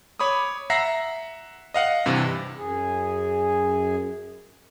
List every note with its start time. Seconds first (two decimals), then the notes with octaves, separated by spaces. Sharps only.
0.20 C#5 B5 D6 D#6
0.70 E5 F#5 A#5 A#6 C7
1.74 D#5 F5 F#5
2.06 G2 C3 E3
2.56 F#2 G#4